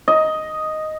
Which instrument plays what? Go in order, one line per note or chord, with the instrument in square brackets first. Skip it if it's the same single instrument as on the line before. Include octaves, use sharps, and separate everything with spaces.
[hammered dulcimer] D#5